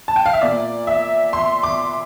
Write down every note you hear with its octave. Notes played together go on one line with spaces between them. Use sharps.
A5
G5
F5
E5
A#2 D5
E5
C6
D6